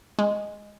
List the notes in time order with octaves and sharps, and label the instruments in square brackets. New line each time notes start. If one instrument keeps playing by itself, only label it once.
[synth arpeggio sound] G#3